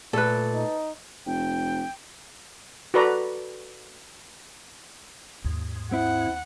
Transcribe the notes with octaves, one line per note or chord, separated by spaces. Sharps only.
A#2 A3 A4 B4
D#4
F1 G5
F#4 A4 B4 D5 A#5
D#2 G#2
C4 E4 F#5